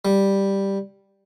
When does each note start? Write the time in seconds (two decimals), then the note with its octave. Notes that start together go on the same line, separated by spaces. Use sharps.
0.05 G3